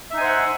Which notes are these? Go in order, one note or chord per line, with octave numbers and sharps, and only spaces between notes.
D#4 C5 E5 F#5 G#5